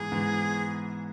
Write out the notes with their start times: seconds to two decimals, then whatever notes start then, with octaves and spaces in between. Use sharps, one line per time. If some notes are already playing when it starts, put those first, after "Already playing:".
Already playing: G#2 E3 B3 G#4
0.12 G#2 E3 B3